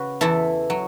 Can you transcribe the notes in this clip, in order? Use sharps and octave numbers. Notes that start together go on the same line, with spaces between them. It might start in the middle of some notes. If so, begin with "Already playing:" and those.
Already playing: C#3 F#4 B4
E2 E3 E4 A4
F#3